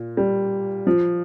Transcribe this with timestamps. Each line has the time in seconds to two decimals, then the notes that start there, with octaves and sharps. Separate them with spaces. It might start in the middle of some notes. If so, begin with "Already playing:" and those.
Already playing: A#2
0.17 G3
0.87 F3